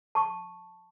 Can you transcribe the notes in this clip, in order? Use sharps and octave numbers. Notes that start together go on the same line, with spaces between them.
A5 C#6